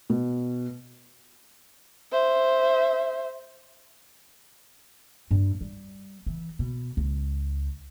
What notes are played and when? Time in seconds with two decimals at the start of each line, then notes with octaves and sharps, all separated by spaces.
0.10 B2
2.12 C5 E5
5.31 G2
5.61 G3
6.26 E3
6.59 B2
6.97 C#2